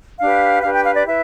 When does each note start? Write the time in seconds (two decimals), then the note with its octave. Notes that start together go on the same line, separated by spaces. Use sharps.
0.20 D4 G4 B4 F5
0.62 D4 G4 B4 F5
0.73 G5
0.84 F5
0.95 D5
1.05 E4 B4 E5